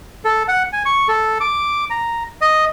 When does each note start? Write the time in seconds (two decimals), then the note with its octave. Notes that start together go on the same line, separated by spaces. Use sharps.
0.25 A4
0.48 F#5
0.73 G#5
0.86 C#6
1.08 A4
1.41 D6
1.90 A#5
2.41 D#5